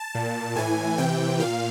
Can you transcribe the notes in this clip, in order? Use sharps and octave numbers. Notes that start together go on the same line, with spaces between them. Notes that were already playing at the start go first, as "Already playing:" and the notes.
Already playing: A5
A#2
A2 E3 G#5
C3 E3 G5
A#2 F5